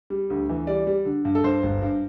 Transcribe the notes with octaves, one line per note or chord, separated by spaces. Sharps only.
G3
D2
E3
G3 D5
G3
D3
G2
A4
G2 C5
G1
G2